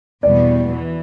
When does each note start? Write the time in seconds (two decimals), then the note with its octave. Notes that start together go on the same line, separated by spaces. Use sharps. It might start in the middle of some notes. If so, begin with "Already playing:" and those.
0.23 E2 B2 G3 B3 D5
0.72 E3